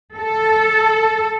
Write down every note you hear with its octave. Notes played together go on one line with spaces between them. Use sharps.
A4